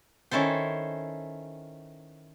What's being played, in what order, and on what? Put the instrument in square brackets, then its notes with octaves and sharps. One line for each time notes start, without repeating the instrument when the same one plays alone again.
[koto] D#3 C#4 E4 A4 C5